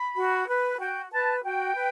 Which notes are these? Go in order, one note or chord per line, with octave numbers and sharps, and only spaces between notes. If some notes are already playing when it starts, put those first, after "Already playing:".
Already playing: B5
F#4
B4
F#4 G5
B4 A5
F#4 G5
B4